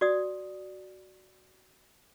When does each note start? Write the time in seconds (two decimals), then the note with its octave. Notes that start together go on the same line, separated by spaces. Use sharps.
0.01 F#4 D5 D#6